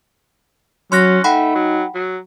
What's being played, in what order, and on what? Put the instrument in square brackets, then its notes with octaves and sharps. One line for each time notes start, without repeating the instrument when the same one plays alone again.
[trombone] F#3 [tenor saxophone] C#4 [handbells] C6 F#6 A#6
[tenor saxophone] A3 [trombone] D#4 [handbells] F#5 G5 B5
[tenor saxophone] F#3
F#3